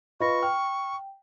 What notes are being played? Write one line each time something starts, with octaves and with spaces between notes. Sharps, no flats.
F4 B4 D#5 B5 C#6 A#6
G5 F6